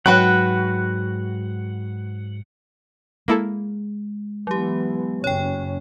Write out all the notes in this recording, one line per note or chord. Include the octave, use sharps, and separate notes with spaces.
G#2 F#3 F#4 B4 F#5 G5
G#3 A#3 E4 A4
E3 F#3 B3 G4
F#1 F#2 C#4 C#5 G5